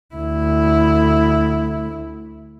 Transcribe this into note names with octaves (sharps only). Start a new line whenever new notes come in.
D2 E4